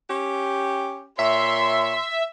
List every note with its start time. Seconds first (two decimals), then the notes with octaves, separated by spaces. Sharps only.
0.10 C#4 G4
1.19 A#2 C#5 E5 C6